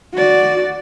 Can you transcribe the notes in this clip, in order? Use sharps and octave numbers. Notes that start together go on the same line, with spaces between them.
F#4 D5